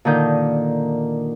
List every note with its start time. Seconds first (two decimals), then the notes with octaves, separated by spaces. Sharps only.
0.05 A#2 D3 D#3 G6